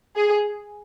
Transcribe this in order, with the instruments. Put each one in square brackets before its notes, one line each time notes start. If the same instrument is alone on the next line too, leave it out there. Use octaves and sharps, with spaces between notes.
[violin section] G#4